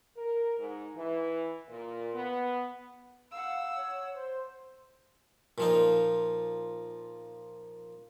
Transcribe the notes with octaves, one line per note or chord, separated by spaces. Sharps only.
A#4
G#2
E3
A#2
B3
F5 F#5 E6
C#5
C5
A#2 F3 D#4